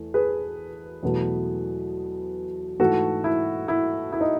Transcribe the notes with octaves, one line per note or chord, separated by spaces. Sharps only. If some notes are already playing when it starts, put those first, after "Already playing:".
Already playing: E2 A3
G#4 B4
E2 B2 F#3 A3
G#2 E3 A3 F#4 A4
E4
E4
E4
D#4